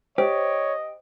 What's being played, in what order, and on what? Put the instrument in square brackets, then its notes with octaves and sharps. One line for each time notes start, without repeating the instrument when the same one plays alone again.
[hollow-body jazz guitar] G4 [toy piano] C5 [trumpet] C#5 [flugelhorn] D#5